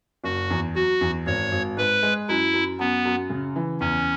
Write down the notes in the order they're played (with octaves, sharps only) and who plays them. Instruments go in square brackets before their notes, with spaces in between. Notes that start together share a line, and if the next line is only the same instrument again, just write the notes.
[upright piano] F#1 [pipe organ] F#4
[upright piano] E2
[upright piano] F#3 [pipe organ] F#4
[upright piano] E2
[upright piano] G#1 [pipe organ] C#5
[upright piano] G#1
[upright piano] G#2 [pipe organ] B4
[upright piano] G#3
[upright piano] F#2 [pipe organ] E4
[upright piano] F#2
[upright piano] F#2 [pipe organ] B3
[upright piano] F#2
C#3
E3
[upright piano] E2 [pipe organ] C#4